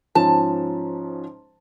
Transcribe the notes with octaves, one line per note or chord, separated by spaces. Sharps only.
G#2 F3 C#4 A5